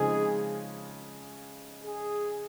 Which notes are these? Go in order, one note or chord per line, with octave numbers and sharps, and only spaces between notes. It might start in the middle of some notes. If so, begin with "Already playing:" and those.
Already playing: C#3 F3 G#3 C4 D#4 G#4
G#4